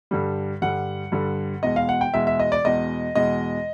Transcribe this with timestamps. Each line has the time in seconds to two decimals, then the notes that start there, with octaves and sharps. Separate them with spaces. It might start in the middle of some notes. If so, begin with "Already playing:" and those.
0.11 G2 D3 G3
0.62 G2 D3 G3 F#5
1.12 G2 D3 G3
1.63 E2 B2 G#3 D#5
1.76 F5
1.89 F#5
2.01 G5
2.14 E2 B2 G#3 E5
2.27 E5
2.40 D#5
2.52 D5
2.65 E2 B2 G#3 D#5
3.15 E2 B2 G#3 D#5